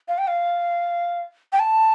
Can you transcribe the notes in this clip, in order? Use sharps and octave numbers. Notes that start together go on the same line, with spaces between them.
F5
G5
F5
G5
A5